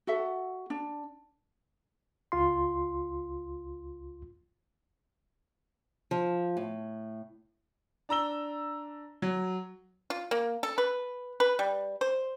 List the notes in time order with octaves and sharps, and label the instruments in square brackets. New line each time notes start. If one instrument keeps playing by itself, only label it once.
[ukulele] F#4 A4 E5 F#5
D4
[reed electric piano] C#2 F4 C6
[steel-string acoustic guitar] F3
A2
[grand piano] D4 A#5 E6 G7
F#3
[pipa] F4
A#3
A4
B4
B4
G3
C5